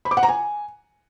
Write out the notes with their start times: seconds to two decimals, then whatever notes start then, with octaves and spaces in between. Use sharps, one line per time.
0.05 B5
0.11 D6
0.17 F#5
0.23 A#5
0.29 G#5